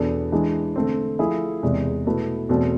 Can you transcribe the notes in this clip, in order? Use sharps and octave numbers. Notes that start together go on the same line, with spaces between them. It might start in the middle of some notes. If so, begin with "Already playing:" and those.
Already playing: E2 B2 B3 D4 A4
E3 G#3 D4 G#4
D3 A3 C4
F3 A3 E4 G#4
E2 C3 G#3
B2 A3 E4 B4
E2 B2 A3 C4